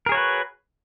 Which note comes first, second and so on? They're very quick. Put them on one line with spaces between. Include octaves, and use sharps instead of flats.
A#4 G#4 C#5 F#4 B4